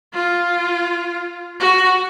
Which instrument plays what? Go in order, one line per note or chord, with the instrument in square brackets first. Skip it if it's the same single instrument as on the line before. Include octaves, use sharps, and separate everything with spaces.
[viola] F4
F#4